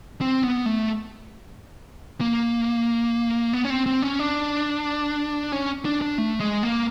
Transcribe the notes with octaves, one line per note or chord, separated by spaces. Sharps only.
C4
B3
A3
A#3
B3
C#4
C4
C4
C#4
D4
C#4
D4
D4
A3
G#3
A#3